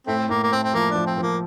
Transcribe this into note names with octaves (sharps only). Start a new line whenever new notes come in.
A2 A3 C4
A2 A#3
A#3
A3 C4
C4
F3 A#3
D4
F3
C4
F3 A#3